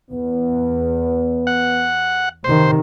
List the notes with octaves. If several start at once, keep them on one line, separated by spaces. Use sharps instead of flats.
E2 B3
F#5
C3 D#3 C5